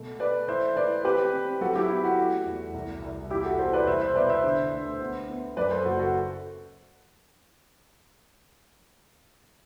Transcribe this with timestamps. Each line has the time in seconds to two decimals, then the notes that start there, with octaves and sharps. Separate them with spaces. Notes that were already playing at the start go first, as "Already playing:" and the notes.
Already playing: B2 A3
0.20 A3 B4 D5
0.48 E3 C5 E5
0.76 E3 B4 D5
1.04 C4 G4 B4
1.33 C4
1.61 F#3 F#4 A4
1.75 E4 G4
1.89 B3 E4
2.04 F#4
2.18 A3
2.46 E2
2.74 C2
3.02 C2
3.30 E2 E4 G4
3.45 F#4 A4
3.59 E2 A4 C5
3.73 B4 D5
3.87 C2 C5 E5
4.01 C5 E5
4.16 B2 B4 D5
4.29 C5 E5
4.44 D3
4.72 D2
5.00 B3
5.29 B3
5.57 F#2 B4 D5
5.71 A4 C5
5.85 F#1 F#4 A4
5.99 F#4 A4